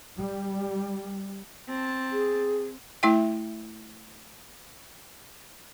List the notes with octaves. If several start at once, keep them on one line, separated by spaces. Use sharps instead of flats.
G3
C4 A5
G#4
A3 E4 E5 G5